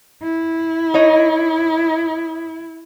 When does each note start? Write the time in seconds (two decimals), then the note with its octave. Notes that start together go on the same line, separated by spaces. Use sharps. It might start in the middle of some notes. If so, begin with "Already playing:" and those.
0.23 E4
0.94 D#4 C#5 D#5